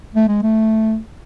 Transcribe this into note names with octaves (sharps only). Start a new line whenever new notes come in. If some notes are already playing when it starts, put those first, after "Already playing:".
A3
G#3
A3